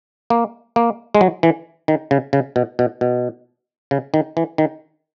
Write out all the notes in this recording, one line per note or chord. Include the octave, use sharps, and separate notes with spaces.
A#3
A#3
G#3
F#3
E3
D#3
C#3
C#3
B2
B2
B2
C#3
D#3
E3
D#3